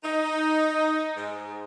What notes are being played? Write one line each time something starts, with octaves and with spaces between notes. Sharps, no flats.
D#4
G#2